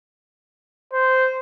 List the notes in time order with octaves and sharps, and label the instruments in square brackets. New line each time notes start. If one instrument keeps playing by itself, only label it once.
[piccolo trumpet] C5